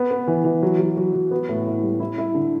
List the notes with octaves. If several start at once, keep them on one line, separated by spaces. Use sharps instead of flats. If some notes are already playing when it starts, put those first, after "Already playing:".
Already playing: B3
B3
E3
E3
F#3
F#3
F#3
F#3
B3
A2
E4
G3
E4
E4
D3